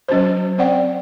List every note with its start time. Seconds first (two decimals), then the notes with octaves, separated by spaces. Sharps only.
0.08 F#3 C#4 F#4 C5
0.58 C4 C5 D5 F#5 G5